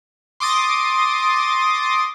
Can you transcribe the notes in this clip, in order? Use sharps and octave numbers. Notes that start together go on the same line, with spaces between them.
C6 D6 D#6 A6 A#6